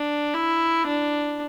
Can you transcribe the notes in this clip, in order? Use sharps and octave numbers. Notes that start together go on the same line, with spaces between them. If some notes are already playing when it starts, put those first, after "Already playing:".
Already playing: D4
E4
D4